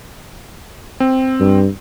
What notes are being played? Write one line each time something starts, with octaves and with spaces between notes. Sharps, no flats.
C4
G2